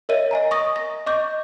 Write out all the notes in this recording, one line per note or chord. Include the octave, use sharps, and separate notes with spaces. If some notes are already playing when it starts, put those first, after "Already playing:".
A#4 C#5 D#5 E5 D#7
D#5 G#5 A#5
C#6 D#6 A#6
A#6
D#5 C#6 D6 G6